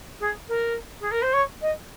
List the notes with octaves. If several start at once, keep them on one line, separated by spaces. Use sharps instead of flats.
G#4
A#4
G#4
A#4
C5
C#5
D#5